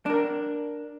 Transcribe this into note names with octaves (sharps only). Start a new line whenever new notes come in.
D4 A#4